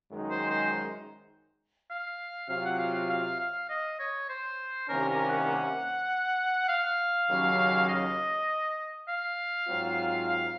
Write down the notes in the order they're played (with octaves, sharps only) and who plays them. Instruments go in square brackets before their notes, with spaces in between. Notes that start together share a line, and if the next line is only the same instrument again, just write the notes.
[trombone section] F#2 D#3 G#3 D#4
[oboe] C5
C5
F5
[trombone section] C3 F#3 C4 F4 [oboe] F5
[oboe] F#5
F5
F5
F5
F5
D#5
C#5
C5
[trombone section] C2 C3 D#3 A#3 C#4 [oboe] A#4
[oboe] A#4
F#5
F5
[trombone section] D#2 C#3 F#3 C#4
[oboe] D#5
F5
[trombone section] G#2 F#3 C4 F4
[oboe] F5